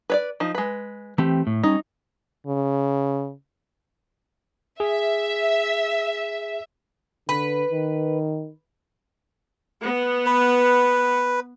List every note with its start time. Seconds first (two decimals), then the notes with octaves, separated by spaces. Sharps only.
0.10 B4 C#5 D5
0.40 F3 D#4
0.55 G#3 B4
1.18 E3 A3 C4 G4
1.47 A2
1.63 G3 C#4 D#4
2.47 C#3
4.80 G#4 E5
7.29 D3 B4
7.70 D#3
9.84 B3
10.26 B4